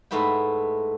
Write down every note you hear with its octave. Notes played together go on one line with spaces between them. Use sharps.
G#2 A3 B3 E4 G5